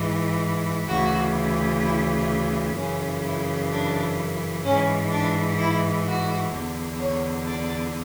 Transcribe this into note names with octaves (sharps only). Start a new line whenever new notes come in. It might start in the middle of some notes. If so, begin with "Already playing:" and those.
Already playing: G#2 E3
D2 C#3 E3 F#4
E4
F#2 C#3 E3 C#4
E4
D4
G#2 E3 C#4
D4
E4
F#4
E2 D3
C#5
D5